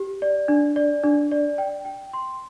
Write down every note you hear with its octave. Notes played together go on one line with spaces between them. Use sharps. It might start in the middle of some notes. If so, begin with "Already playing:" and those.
Already playing: G4
D5
D4
D5
D4
D5
G5
G5
C6